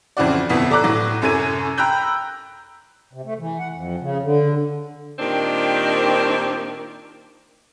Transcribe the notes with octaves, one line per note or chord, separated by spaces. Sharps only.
F2 C#3 E3 C4 F#4 D5
G1 F2 B2 B3 E4 B6
A4 D5 A#5 D6 F#6
A2 F#3
C2 F#2 C#4 A4 G#6 D#7
G5 A#5 B5 E6 F#6 G6
C3
A3
E3
F#5
F2
C#3
D3
A#2 D#3 C4 D4 G4